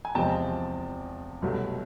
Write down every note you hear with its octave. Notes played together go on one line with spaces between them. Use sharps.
G#5
E2 C3 F3 G#3 C4 G5 A5
C2 B2 F#3 A3